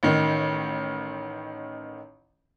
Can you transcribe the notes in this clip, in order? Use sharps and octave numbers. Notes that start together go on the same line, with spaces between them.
A1 D#3